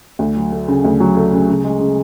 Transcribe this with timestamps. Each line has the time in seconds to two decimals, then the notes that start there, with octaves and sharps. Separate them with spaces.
0.19 D2
0.36 F#3
0.52 A3
0.68 C#3
0.84 D2
1.00 F#3
1.17 A3
1.33 C#3
1.49 C#3
1.64 G#3
1.80 C#3